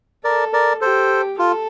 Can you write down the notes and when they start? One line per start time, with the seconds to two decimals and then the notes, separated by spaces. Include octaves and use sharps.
0.24 A4 A#4 D5
0.53 A#4 D5
0.81 G4 A4 C5
1.38 F4 A4